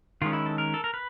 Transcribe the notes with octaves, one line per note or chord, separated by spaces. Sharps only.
D#3 G#3 C#4 F4
E4
A4
A#4
A4
A#4
B4